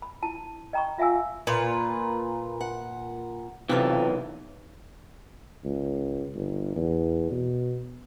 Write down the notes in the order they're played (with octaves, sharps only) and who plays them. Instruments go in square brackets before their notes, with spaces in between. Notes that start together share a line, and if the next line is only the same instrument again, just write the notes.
[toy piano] B5
E4 A5
D#5 G5 A#5 B5 C#6
F4 E5 F5 G#5 E6
[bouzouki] A#2 B4 [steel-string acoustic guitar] F4
[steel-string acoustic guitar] F#5
[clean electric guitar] B1 E3 [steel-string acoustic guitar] C3 F4 A4
[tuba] C#2
G1
E2
B2